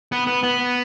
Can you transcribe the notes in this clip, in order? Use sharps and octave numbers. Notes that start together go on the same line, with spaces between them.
B3
B3
B3